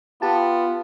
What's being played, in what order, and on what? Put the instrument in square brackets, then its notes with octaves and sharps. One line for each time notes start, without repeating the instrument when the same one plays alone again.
[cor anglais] B3 [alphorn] F4 [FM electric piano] G4 A5